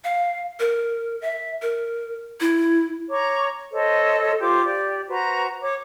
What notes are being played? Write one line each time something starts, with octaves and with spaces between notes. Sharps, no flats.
F5
A#4
E5
A#4
E4
C#5 A#5 C#6 D6
A4 C5 C#5 D#5
F4 G4 C5 D6
G4 D5
F#4 B4 C5 A#5
C#5 D6